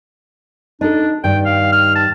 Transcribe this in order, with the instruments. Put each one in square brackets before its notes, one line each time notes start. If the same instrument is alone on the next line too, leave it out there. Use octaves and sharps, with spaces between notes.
[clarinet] D4 [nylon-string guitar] D#4 A4
[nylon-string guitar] G2 D#3 [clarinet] G5
[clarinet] F5
F6
A5